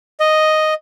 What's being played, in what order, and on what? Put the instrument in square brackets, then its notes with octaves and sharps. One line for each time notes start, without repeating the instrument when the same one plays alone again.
[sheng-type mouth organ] D#5